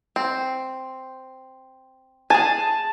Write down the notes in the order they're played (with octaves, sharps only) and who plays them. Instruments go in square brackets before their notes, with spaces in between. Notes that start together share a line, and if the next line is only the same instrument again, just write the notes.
[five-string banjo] C4
[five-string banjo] G#4 G#5 [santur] A5